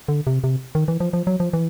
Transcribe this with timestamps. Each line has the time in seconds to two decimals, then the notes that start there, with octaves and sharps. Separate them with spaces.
0.08 D3
0.27 C3
0.44 C3
0.75 D#3
0.88 E3
1.00 F3
1.13 F3
1.27 F#3
1.40 F3
1.53 E3